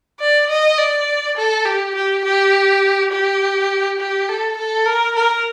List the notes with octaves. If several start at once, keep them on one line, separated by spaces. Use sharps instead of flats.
D5
D#5
D5
A4
G4
G4
G4
G4
G4
A4
A4
A#4
A#4